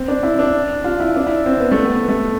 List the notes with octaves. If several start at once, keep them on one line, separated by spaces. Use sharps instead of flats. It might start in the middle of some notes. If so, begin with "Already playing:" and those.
Already playing: C4
D4
E4
D4
F4
E4
D4
E4
C4
B3
A3
B3
A3